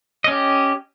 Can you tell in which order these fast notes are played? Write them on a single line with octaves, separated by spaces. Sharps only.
D#5 C#4 G4